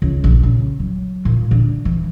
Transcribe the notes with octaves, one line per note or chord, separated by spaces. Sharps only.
C#2
A#1
C#3
F#3
A#2
D3
E3